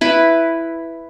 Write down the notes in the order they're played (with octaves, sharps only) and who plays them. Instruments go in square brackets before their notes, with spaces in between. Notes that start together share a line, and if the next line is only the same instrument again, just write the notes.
[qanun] E4 B4